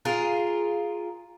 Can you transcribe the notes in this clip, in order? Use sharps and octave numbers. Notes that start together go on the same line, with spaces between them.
F4 G#4 A#4